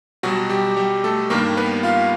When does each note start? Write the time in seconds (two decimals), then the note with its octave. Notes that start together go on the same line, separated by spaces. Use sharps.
0.23 B2 F#3 G3 F#4
0.49 G3 G4
0.76 G3 G4
1.04 A3 A4
1.30 G2 D#3 G3 A#3 A#4
1.57 B3 B4
1.83 F4 F5